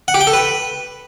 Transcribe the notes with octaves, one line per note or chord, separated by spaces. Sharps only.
F#5
G4
G5
A4
B4